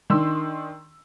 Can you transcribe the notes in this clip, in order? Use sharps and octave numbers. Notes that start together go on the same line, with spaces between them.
D#3 D4 C6 E6